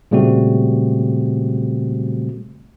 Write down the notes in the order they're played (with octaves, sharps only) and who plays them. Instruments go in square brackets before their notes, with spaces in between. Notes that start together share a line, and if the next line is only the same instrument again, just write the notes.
[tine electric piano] A#2 C#3 G3 A3 C4 F#4